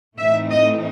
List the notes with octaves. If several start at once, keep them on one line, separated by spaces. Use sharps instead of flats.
A2 E3 A3 C4 D#4 E5
D#5